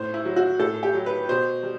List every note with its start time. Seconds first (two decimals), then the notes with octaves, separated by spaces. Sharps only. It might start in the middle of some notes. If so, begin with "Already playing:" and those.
Already playing: A2 C5
0.14 E4
0.25 F#3
0.36 F#4
0.59 A2 A4
0.83 G4
0.94 F#3
1.06 B4
1.29 B2 C5
1.63 G3